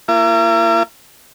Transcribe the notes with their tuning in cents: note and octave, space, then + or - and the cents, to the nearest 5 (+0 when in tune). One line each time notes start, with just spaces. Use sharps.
A#3 -15 E4 +45